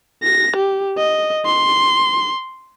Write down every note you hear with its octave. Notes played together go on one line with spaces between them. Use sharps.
A#6
G4
D#5
C6